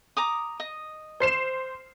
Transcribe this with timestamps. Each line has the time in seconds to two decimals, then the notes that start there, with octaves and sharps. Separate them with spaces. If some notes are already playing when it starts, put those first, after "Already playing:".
0.17 A#5 D6 D#6
0.60 D#5
1.20 C5 C7 E7